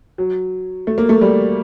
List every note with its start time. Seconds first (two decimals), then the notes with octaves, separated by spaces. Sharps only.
0.18 F#3
0.87 A3
0.98 A#3
1.09 A3
1.21 G3